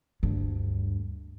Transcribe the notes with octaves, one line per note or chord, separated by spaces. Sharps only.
D2 G2